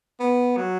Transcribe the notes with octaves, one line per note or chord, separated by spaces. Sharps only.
B3
F#3